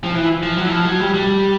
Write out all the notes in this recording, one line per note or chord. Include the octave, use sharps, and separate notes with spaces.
F3
E3
F3
F#3
E3
F3
F#3
G3
G3